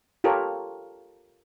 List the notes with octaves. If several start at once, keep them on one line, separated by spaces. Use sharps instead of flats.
F4 G4 A4 A#4 C#5